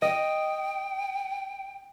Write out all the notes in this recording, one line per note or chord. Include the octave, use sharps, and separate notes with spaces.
D#5 G5